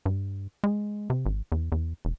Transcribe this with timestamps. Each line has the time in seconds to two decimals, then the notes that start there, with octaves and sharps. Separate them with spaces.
0.06 G2
0.64 G#3
1.10 C3
1.26 G#1
1.52 E2
1.72 E2
2.05 E1